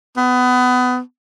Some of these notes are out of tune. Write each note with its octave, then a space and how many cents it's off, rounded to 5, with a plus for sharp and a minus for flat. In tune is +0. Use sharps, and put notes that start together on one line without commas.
B3 +25